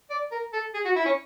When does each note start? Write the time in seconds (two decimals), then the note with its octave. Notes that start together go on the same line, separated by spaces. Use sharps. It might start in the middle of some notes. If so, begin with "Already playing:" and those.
0.10 D5
0.31 A#4
0.53 A4
0.74 G#4
0.85 F#4
0.96 E4
1.06 C#4